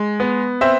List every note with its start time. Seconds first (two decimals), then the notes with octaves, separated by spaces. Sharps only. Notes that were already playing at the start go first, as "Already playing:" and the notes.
Already playing: G#3
0.20 B3
0.61 C4 C5 E5